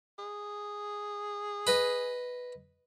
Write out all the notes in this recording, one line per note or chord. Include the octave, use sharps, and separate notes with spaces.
G#4
B4 D#5